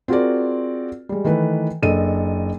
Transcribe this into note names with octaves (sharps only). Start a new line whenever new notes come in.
C4 F4 F#4 G#4 A#4 D5
G3 G#3
D#3 E3 A3 B4
F#1 D4 A4 D#5 D#7